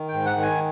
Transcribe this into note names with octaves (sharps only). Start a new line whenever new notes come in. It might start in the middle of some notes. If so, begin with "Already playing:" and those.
Already playing: D#3
G5
G#2
F#5
D#3
G#5